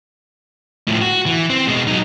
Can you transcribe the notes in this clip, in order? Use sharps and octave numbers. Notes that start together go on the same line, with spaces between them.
A2 F3
F#4
E3
C4
B2 G#3
F#3 D#4